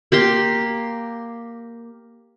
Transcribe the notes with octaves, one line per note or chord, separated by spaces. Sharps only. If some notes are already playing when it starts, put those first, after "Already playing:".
A#3 G4 C6